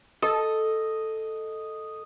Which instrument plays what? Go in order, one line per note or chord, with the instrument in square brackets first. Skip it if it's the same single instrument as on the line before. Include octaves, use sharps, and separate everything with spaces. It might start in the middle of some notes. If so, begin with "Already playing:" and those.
[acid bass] A4 [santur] D#5